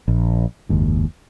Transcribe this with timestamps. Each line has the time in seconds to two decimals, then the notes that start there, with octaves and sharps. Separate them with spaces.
0.08 A#1
0.69 F#1 D#2 G#2